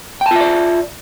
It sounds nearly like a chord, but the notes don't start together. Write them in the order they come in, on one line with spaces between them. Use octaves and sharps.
G5 A5 F4 E5 D5